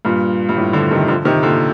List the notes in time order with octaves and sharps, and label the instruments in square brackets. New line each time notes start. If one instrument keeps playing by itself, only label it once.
[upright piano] G2 A#2
G2
A2
D3 F3
C3 D#3
D3 F3
C3 D#3
A#2 D3